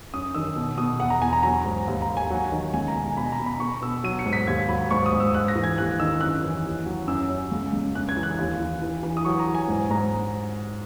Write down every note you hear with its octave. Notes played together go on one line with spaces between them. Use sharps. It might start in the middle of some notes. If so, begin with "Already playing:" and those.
F#2 D#6
D#3 E6
B2
B2 D#6
E2 F#5
A#5
E2 G#5
A#5
F#3 A#5
G#2
D#2
A#5
D#2
G#5
F#3 F#5
D#3
C#2 G#5
A#5
B2
G#5
B2 B5
A#5
B2
B5
B2 C#6
B2 E6
F#3 D#7
C#7
G#2
B6
D#2 G#6
F#3 B5
G#2 C#6
D#6
G#2
E6
G#2 F#6
A#6
E3
G#6
D#2 F#6
D#3 E6
F#2 F#6
E3
D#2
F#3
F#2 E6
F#2
C#2
C#2
F#2 F#6
G#6
E3
F#6
D#2
E3
E3
E3
D#6
F#3 C#6
A#5
F#3
G#5
G#2
G#2 A#5